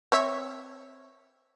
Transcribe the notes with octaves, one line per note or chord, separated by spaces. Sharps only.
C4 C#5 E5